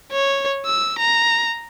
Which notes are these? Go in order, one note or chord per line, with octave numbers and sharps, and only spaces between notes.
C#5
E6
A#5